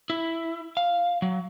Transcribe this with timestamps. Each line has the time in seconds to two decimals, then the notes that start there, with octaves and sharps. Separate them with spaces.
0.10 E4
0.77 F5
1.22 F#3